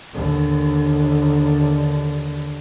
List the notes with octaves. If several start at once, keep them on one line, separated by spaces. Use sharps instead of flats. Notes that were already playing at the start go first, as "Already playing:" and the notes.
D#2 D3